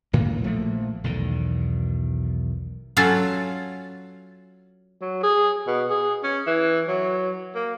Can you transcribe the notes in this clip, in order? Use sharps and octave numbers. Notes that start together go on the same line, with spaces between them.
C#2 A2 D#3 A#3
A#1 F3 A3 A#3
B1 E2 D#3
F#3 C#4 F4 A4 F5 F#5
F#3
G#4
B2
G#4
C#4
E3
F#3
A#3